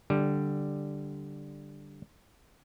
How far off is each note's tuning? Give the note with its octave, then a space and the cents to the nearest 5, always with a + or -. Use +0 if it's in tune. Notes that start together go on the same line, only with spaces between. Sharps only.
D3 +0 G3 +0